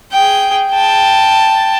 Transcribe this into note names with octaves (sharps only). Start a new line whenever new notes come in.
G#4 G5
G5 A5